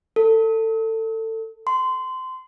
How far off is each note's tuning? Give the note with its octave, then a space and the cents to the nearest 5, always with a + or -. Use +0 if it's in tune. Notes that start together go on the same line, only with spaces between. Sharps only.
A4 +25
C6 -20